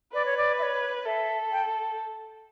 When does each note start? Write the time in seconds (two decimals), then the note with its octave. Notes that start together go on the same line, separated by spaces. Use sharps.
0.13 B4 D5
0.25 C#5
0.37 D5
0.59 E5
0.63 C#5
1.06 A4 E5
1.52 G5